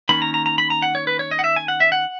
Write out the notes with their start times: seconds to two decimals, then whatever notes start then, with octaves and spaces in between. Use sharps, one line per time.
0.09 D#3 A#3 C#4 B5
0.22 A#5
0.34 A#5
0.46 A#5
0.58 B5
0.70 A#5
0.82 F#5
0.95 C#5
1.07 B4
1.19 C#5
1.31 D#5
1.39 F#5
1.44 E5
1.56 G#5
1.68 F#5
1.80 E5
1.92 F#5